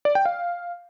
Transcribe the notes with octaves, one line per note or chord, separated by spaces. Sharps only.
D5
G5
F5